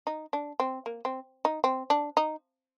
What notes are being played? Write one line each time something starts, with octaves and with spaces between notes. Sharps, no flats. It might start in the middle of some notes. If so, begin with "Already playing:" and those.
D#4
D4
C4
A#3
C4
D#4
C4
D4
D#4